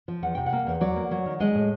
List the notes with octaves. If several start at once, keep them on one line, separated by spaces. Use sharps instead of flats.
F3
E2 F#5
C3 G5
F#5
A#3
E2
F#3 D5
A#3
F#3
D#3
G#3 D#5
A2